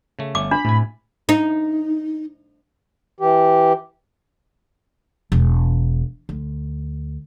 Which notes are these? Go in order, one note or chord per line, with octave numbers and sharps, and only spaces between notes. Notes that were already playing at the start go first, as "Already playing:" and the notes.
C#3 A3
G1 A3 C#4 D6
D4 B5
A2 C3 G#5
D#4
E3 G4
E1
D2